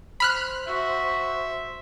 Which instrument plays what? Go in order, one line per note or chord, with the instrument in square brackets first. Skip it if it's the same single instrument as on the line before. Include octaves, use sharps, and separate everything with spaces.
[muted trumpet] C5 [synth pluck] B5 F6 F#6
[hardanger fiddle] F#4 [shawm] E5